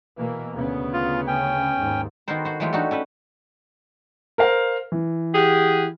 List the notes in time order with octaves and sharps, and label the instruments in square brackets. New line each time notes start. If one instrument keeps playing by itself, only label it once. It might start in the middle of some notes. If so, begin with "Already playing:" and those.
[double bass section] B2 E3 A#3
D2 C#3 B3
[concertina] F4
C#4 G5
[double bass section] D#2 G#2
[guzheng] D#3 B3 F#4 A4 A#4 C5
F#4 C5
E3 F#3 G#3 A3 F4 G4
D4 D#4 F#4 G4 A4
C#4 A4 B4
[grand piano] A#4 C5 F5
E3
[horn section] G4 G#4 F#5